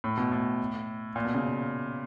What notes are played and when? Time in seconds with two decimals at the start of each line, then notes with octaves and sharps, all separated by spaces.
0.04 A2
0.17 B2
0.32 A2
1.16 A#2
1.25 B2
1.34 C#3